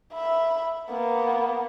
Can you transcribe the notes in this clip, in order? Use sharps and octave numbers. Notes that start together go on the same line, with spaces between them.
E5 B5
A#3 B3